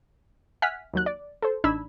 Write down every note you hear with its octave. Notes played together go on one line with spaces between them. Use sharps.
E5 F#5 G#5 F6 F#6 B6
D#2 F#3 F#6
D5
A4 C5
A1 D4 D#4 B5 E6 G#6